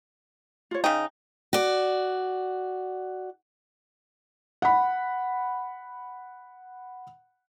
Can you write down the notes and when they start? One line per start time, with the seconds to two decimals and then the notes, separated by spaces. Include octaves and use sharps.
0.71 F4 C#5
0.84 C#3 D#4 G5
1.53 F#4 D5
4.62 F#5 B5